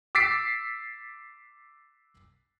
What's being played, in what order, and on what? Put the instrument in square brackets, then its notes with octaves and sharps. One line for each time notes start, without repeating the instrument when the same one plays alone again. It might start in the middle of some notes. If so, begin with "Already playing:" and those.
[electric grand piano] D6 E6 A6 B6 C7 D7